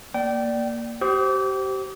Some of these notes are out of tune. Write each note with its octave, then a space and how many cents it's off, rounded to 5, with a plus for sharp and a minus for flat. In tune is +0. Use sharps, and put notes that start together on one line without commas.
A#3 +0 D5 +0 G5 -25
G4 -30 C5 +0 D#6 +20